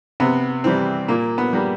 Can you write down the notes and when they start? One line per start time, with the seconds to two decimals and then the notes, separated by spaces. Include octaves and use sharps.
0.20 C3 B3
0.64 E3 G3 C4
1.08 A#2 A#3
1.38 B3
1.53 G3 A#3